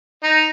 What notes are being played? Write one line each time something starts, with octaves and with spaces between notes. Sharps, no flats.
D#4